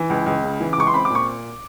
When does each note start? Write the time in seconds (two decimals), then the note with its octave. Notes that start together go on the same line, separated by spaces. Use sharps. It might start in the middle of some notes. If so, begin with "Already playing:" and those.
Already playing: E3
0.10 C#2
0.26 C#2
0.43 C#3
0.60 E3
0.73 D6
0.77 C#2 C#6
0.87 C6
0.94 C4 B5
1.05 D6
1.10 A#2 C#6